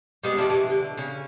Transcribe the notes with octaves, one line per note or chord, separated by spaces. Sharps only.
G3 G#3 B3
G3 A3 A#3 D4
E3
D3
C#3 C#4